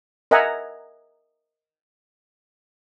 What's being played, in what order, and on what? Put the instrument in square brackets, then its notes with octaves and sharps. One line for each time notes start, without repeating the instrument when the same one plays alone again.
[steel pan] A#4 D#5 E5 F#5 G#5 A#5